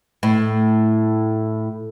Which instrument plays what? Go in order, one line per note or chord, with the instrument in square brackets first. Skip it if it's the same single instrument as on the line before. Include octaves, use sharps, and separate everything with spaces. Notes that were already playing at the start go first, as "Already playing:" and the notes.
[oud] A2